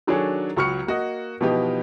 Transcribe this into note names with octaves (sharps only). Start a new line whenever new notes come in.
D#3 F#3 D4 G#4 A4 C#5
C#2 F#3 C#6 F6 C#7
A#3 F#4 D#5
B2 E3 F3 B3 D#4 G4